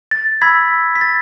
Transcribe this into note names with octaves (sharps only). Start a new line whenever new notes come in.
A6
B5 E6 G#6 B6
B6
A6